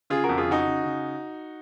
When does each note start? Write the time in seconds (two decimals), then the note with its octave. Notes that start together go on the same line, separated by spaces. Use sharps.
0.10 C#3 F4 G#4
0.24 F#4 A#4
0.29 F2
0.37 F4 G#4
0.47 C#3 D#4 F#4
0.64 C#3
0.83 C#3